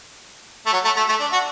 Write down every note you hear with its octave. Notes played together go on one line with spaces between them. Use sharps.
A3
F#3
A3
A3
A3
D4
F#4